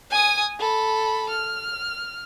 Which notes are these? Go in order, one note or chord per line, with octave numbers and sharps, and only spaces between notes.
G#5 D#6
A4 B5
F6